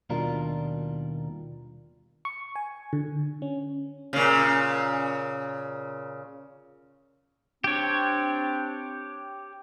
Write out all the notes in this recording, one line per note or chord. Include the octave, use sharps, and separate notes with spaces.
D#2 B2 G3 D4 F4 A#4
C#6
G#5
D3
C#4
A#2 C#3
C4 D4 G4 C#5